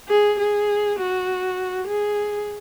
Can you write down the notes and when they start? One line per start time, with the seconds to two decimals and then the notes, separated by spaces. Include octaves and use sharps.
0.09 G#4
0.39 G#4
0.99 F#4
1.87 G#4